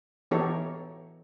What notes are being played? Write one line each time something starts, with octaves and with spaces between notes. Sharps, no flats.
E3 B3 D#4 G4 A4 C#5